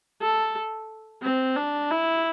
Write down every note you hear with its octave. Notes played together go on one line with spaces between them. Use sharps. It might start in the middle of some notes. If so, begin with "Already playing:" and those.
A4
C4
D4
E4